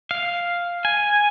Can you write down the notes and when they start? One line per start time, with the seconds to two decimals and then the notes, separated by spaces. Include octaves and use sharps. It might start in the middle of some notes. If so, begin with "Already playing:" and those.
0.11 F5
0.85 G#5